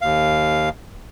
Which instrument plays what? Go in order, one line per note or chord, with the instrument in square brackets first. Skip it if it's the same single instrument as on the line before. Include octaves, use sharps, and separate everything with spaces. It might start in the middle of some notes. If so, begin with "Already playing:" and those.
[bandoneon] D#2 F5